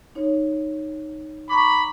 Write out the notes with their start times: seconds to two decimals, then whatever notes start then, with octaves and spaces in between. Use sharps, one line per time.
0.15 D#4 C#5
1.49 A#5 B5 C#6 D6